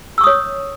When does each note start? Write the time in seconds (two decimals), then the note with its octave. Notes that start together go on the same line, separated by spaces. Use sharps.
0.18 E6
0.21 C#6
0.24 D#6
0.27 C#5